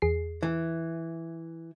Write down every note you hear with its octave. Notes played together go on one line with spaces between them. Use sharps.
E2 G#4 C7
E3